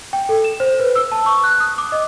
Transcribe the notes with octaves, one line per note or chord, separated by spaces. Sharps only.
G5
A4
E7
C5
B4
E6
A5
C#6
F#6
D#6
D6
D#5